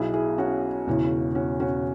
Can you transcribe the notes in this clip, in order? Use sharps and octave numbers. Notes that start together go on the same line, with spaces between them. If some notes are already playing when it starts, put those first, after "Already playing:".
Already playing: B1 B2 E4 G#4
E4 G#4
C#4 F#4
E1 E2 C#3 E3
C#4 F#4
C#4 F#4